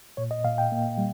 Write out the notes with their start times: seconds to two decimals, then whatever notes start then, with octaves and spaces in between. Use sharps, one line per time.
0.17 A#2 C#5
0.31 D#5
0.44 A#2 F5
0.58 G5
0.72 A#3
0.98 G3